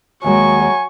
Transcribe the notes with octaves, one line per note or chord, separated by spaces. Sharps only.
D#2 F#3 G#3 G#5 C#6